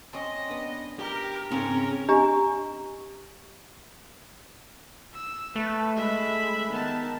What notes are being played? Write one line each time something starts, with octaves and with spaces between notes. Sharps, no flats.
C4 C#4 D#5
B3 D4
G4 A#4 G5
G#2 C#3 C4 C#4 A#4 A5
D4 G4 D#5 G#5 A#5
E6
A3 B4
G#3 E5 B5
D#3 B3 A5